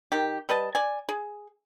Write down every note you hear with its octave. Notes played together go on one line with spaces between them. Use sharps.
D#3 G4
G3 B4 D#5 A5
D5 G#5
G#4